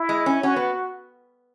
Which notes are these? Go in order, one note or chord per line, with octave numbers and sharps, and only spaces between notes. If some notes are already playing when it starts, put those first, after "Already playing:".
Already playing: E4
G#3
C#4
C#4 F#4
B3